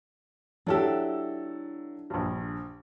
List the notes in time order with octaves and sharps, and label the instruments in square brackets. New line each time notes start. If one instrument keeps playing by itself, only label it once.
[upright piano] F#3 A4 E6 [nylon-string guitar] D4 E4 G4
[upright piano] A#1 G2